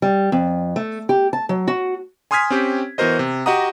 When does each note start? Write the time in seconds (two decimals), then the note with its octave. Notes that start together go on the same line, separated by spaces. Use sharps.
0.02 G3
0.32 F2
0.76 A3
1.09 G4
1.33 A5
1.49 F#3
1.68 F#4
2.31 G#5 C6 D#6 F6 G#6 B6
2.50 C4 C#4 G4
2.98 E3 B3 F#4 A#4 C5 D#5
3.19 C3
3.46 F#4 G4 D#5 F#5 A#5 D#6